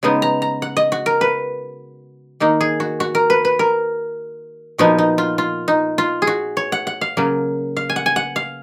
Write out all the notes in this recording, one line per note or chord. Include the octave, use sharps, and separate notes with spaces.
C#3 G#3 B3 D#4
A#5
A#5
F#5
D#5
F#4
A#4
B4
D#3 A#3 D#4
G#4
F#4
F#4
A#4
B4
B4
A#4
A#2 F3 B3 D#4 F#4
D#4
F4
F4
D#4
F4
G#4
F#4
C#5
F#5
F#5
F5
C#3 F#3 A#3
F5
G#5
F#5
G#5
F#5
F5